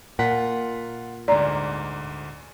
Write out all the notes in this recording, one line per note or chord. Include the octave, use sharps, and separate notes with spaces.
A#2 F4 F#5 B6
D2 G#2 D5 A#5